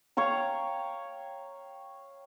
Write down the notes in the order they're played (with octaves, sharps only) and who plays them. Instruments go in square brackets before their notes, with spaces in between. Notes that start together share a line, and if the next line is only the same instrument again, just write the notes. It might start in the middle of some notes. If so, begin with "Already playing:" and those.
[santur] C#5 F5 G5 A#5